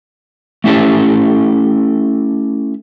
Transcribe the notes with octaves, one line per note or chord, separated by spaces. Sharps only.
A3 C#4 E4 G4 A4